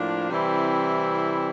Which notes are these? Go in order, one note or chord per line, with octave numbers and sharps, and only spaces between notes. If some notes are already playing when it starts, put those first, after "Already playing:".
Already playing: A2 F3 A#3 D4
C3 E3 G3 C4 E4